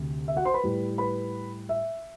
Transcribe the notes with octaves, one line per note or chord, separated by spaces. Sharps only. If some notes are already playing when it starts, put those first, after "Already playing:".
Already playing: D2 C3 A3
E5
F#4 F#5
C5 C6
B4 B5
A2 G3
B4 B5
E5